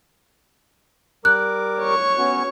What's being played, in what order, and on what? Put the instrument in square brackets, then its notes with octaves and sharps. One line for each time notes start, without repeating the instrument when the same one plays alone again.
[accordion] G3 A#4 D6 [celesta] F#6
[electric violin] C#5 C#6
[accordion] B3 C#4 F#4